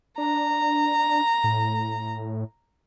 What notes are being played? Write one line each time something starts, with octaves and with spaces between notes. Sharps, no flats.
D4 A#5
A2